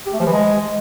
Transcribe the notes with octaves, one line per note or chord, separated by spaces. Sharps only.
G4
A3
F3
E3
G#3